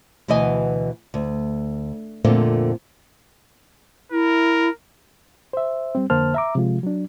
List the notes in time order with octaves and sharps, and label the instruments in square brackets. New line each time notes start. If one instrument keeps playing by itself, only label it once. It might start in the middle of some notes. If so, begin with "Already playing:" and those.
[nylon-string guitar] D2 B2 E3 B3 D#5 G#5
D2
F2 A#2 D3 A3 C4 F4
[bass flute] E4 [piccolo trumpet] A#4
[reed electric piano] C5 E5
G3 C4
F2 D3 A#3 C5 A5 F6
E5 A#5 D6
C3 F3 G#3 F4
F#3 D4